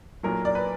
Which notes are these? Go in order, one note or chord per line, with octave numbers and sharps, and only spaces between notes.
B1 A#2 F#3 A#4
D5
B4